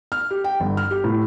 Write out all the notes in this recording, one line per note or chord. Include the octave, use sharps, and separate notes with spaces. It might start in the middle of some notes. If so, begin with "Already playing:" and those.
F6
G4
G5
G1
F6
G4
A2